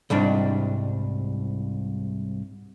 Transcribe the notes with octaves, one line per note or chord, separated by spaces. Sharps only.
C2 G#2 G3 D4